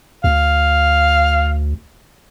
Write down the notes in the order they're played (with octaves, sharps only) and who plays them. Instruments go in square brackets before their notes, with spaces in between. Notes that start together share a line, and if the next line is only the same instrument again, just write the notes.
[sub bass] D2 [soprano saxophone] F5